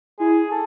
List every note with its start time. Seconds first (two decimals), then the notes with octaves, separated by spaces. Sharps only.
0.19 E4 G#4
0.51 A4